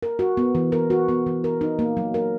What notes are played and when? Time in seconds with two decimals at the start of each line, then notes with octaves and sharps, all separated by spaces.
0.03 A#4
0.19 F#4
0.37 B3
0.55 E3
0.72 A#4
0.90 F#4
1.08 B3
1.26 E3
1.44 A#4
1.61 D#4
1.79 A#3
1.97 F#3
2.14 A#4